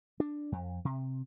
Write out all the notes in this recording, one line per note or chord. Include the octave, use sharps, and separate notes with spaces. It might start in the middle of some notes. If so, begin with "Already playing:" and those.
D4
F2
C3